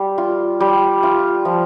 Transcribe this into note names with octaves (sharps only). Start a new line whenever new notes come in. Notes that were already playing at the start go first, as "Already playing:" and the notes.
Already playing: G3
F4
G3
F4
F3